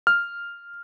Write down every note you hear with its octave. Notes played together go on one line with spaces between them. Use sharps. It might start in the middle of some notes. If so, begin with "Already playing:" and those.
F6